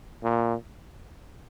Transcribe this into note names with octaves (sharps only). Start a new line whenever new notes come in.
A#2